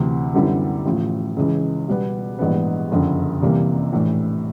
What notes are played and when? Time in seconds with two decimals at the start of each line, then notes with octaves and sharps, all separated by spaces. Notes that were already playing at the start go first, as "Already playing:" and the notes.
Already playing: D2 C3 E3
0.34 F#2 D3 G3 B3 E4
0.85 A1 A2 F3
1.36 C#2 C#3 E3
1.88 B2 G3 B3
2.39 A#1 G#2 E3 G3 B3
2.91 F#1 F2 D3
3.41 C2 C3 E3 G3 A#3
3.92 A#1 A2 E3